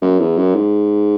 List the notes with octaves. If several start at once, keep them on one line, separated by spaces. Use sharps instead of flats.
F#2
E2
F#2
G#2